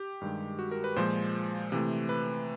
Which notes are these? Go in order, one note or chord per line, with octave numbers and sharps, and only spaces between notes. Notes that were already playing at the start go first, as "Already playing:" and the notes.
Already playing: G4
G2 D#3 G#3
F#4
A#4
B4
A#2 F3 G#3 C5
C3 E3 A3
B4